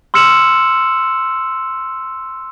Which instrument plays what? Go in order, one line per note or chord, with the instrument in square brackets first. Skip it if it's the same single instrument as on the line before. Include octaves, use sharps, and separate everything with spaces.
[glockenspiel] C6 E6 F6 C#7 E7 F#7